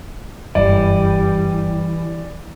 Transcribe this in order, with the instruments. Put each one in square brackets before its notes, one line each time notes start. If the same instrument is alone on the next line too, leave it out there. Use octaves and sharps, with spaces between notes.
[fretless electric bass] F#1 G2 [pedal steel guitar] E3 [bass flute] G3 [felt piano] D5